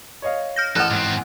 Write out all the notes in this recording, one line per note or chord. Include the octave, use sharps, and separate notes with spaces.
C#5 D#5 F5
F6 G6 A#6
A1 A4 F#5 F6 F#6
G#2 C4